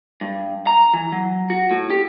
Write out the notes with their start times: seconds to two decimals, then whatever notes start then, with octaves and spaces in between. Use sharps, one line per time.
0.21 G2
0.67 A#5
0.94 E3
1.12 F#3
1.50 F#4
1.71 A2
1.90 G4